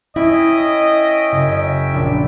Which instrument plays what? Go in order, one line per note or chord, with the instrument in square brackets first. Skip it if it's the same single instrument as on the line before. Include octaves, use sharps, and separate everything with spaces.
[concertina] C#4 E5 G5 [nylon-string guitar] E4 [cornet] D#5
[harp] F#1
A#1 D4